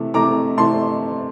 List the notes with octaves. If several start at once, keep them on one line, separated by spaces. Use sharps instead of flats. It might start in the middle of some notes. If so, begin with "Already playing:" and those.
Already playing: C3 E3 A3
C3 E3 A3 A#5 D6
C3 E3 A3 A5 C6